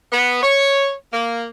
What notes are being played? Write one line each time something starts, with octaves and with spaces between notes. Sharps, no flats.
B3
C#5
A#3